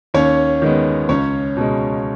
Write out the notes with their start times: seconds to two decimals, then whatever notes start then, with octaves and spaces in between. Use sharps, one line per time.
0.14 D#2 C#4 C#5
0.62 D#3 G#3 B3
1.09 C#2 C#4 C#5
1.57 B2 G#3